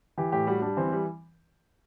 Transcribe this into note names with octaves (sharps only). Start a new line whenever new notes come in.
E3 G4
A2 G4
G3 F#4
G3 D4
E3 C4
G3